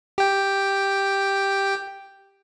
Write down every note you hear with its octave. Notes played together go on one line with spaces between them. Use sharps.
G4 G5